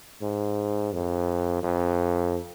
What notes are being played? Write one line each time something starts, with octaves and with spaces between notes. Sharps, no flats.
G#2
F2
F2